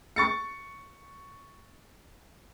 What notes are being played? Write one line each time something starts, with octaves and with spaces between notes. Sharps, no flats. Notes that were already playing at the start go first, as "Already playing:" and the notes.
C#6 A6 C#7